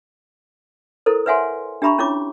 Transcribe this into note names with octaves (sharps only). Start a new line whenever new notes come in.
E4 A4 A#4 C5
B4 C#5 E5 F#5 G#5 C6
D4 G4 E5 A#5 B5 C#6
C#4 E4 F4 C#5 D6